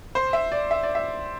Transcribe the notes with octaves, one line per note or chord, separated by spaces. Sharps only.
C5
E5
D5
E5
D5
E5